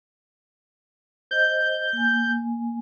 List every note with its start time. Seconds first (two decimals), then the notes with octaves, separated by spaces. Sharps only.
1.31 C5 D#5 G6
1.93 A#3 G#5